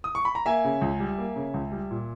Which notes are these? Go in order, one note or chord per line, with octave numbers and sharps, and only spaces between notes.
D#6
C#6
B5
A#5
A#3 E5 G#5
C#3
C#2
G3
A#3
C#3
C#2
G3
A#2